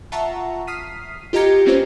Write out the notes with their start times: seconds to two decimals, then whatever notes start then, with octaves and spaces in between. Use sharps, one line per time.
0.12 F4 E5 F#5 A5 A#5 C#6
0.67 D#6 F6 B6 C7 D#7
1.33 F4 G4 D#5 A#5 G#6 C#7
1.66 A#3 C4 C#4 F4 B4 C5